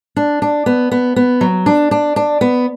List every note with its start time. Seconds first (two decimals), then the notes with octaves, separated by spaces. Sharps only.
0.16 D4
0.42 D4
0.66 B3
0.91 B3
1.16 B3
1.41 F#3
1.66 D4
1.91 D4
2.16 D4
2.41 B3